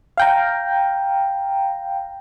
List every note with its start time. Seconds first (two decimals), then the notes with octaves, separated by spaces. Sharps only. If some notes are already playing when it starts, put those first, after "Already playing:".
0.17 F5 G5 A#5